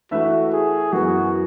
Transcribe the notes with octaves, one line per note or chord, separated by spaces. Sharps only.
E3 A3 E4 F#4 B4 E5
G#4
F#2 E3 B3 F#4